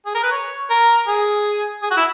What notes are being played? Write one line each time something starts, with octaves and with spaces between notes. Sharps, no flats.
G#4
A#4
B4
C#5
A#4
G#4
G#4
F#4
E4